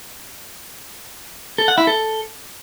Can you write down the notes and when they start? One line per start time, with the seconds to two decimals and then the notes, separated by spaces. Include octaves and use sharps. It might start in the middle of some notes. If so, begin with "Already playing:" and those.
1.58 A4
1.68 F#5
1.78 E4
1.87 A4